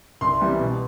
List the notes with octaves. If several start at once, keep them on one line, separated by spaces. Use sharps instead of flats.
C2 C6
C3 E3 G3 B3
B2